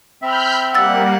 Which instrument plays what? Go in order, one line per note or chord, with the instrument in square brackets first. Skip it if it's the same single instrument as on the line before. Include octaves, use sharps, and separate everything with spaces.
[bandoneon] C4 E5 [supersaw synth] B5 F6 G6
[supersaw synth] G3 A#3 [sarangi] F#5 [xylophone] E6 A6